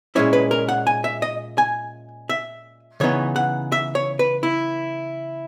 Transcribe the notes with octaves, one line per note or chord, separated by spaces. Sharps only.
A#2 G#3 C#4 E4 C#5
B4
A#4
F#5
G#5
E5
D#5
G#5
E5
C#3 E3 B3 D#4 C#5
F#5
E5
C#5
B4
E4